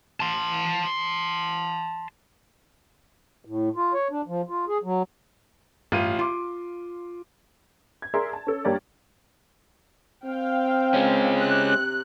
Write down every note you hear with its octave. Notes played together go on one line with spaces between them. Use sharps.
A5 C6
A2
F4
C#5
D4
F3
F4
G#4
F#3
A1 G2 F4 D#7
F4 C6 D6
G#6
G#4 A#4 D5 E5 C6
A5
C#4 A4
G2 A#3 G4 C#5 D5
C4 F5 G5
G#3 C#4
C3 F#6